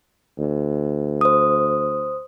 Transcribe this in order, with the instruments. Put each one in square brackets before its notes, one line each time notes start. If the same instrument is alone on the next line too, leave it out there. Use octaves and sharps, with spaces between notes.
[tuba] D2
[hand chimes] C5 D#6